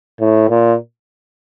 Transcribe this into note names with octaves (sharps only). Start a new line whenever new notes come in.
A2
A#2